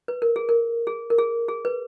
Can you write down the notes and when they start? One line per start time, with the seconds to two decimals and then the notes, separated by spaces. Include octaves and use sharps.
0.08 B4
0.22 A#4
0.36 G#4
0.49 A#4
0.87 G#4
1.10 A#4
1.19 G#4
1.49 G#4
1.65 B4